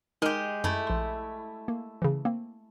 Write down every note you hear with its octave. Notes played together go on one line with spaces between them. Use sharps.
G#3 D#4 G4 A#4 F6
F#2 A3 E4
A#1 C6
A#3
C#3 E3
A#3 C4